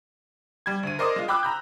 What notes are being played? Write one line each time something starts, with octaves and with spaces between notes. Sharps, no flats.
G3 G#6
D2 D#7
A#4 C5 D5 D#5 C6 D#6
G#3 F4
G5 B5 D6 E6 F#6
A#5 B5 G6